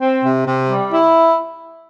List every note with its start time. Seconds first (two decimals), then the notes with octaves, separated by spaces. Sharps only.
0.01 C4
0.23 C3
0.46 C3
0.69 G3
0.92 E4